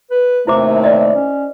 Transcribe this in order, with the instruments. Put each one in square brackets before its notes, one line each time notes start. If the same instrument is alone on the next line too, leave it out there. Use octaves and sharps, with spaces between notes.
[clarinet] B4
[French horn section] D#2 C3 A#4 [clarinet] A3 [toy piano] E4 C5 D6
[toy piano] D5 D#5
[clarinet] C#4